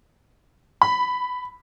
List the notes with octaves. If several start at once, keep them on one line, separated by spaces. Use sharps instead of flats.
B5